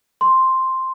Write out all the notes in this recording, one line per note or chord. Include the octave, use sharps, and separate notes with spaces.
C6